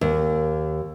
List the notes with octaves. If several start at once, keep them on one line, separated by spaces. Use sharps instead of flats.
D#2